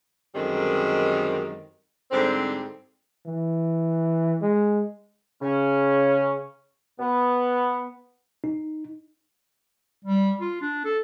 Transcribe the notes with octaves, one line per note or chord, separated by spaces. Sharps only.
F#2 D3 D#3 G3 G#3 C4
G#2 D3 G3 C4
E3
G#3
C#3 C#4
B3
D#4
G3
F4
D4
A4